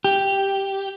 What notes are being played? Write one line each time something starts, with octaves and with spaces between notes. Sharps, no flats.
G4